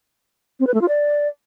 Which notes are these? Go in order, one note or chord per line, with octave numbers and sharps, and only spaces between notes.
C4
B4
A3
F4
D5